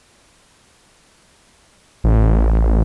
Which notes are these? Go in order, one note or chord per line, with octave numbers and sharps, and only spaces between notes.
A1